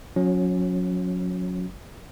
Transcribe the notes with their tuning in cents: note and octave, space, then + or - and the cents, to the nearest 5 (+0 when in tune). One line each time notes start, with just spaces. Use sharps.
F#3 -30 C#4 +0